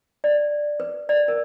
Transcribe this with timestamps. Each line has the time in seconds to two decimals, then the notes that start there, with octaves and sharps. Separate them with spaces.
0.24 D5
0.80 B4
1.09 D5
1.28 A#4